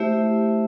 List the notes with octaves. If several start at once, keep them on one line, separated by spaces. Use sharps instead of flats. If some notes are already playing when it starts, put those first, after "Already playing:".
Already playing: A3 E4 G4 C5 E5